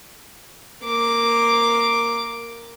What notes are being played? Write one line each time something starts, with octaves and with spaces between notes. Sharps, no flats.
A#3 D6